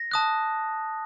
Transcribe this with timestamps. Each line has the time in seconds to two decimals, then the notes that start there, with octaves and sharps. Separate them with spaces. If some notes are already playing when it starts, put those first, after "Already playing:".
Already playing: A#6
0.11 A5 D#6 F#6